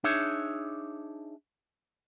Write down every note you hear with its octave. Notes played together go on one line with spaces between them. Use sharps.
D4 D#4 G#4 C#5 E5